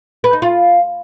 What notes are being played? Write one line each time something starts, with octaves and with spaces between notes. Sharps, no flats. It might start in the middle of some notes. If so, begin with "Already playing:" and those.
B4
D#4
F4